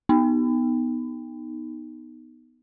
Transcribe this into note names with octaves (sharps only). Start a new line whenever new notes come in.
B3 D#4